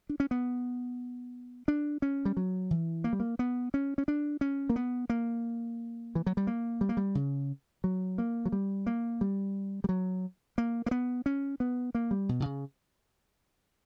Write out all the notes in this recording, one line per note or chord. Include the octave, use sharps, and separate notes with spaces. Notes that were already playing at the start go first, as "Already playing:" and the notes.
D4
C#4
B3
D4
C#4
G3
F#3
E3
A#3
G3
A#3
B3
C#4
C#4
D4
C#4
A#3
B3
A#3
E3
F#3
G3
A#3
G3
A#3
G3
C#3
F#3
A#3
F#3
G3
A#3
G3
G3
F#3
A#3
A#3
B3
C#4
B3
A#3
G3
B2
B2
C#3